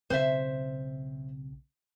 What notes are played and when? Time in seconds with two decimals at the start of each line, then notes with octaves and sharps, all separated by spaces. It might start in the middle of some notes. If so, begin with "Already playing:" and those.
0.10 B1 C#3 C4 C5 E5